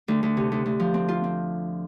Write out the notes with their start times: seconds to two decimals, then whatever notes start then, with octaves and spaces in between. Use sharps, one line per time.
0.08 D2
0.23 D2
0.37 C3
0.52 D2
0.66 D2
0.80 F3
0.94 C4
1.09 F4
1.24 C4